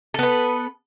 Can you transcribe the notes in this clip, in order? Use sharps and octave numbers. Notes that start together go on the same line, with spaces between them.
B3 A4 B4